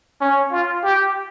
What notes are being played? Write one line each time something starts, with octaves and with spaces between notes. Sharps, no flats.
C#4
F4
G4